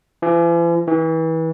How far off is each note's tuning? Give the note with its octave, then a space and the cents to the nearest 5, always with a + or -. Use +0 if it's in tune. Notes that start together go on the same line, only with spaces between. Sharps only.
E3 +45
E3 -30